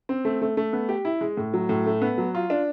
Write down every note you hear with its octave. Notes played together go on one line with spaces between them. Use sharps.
C4
A3
A3
A3
B3
G4
E4
G#3
A2
F#3
A2
A3
B3
F#3
F4
D4